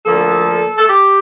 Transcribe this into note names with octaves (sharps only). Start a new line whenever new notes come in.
D2 D3 F3 A#3 A4
A4
G4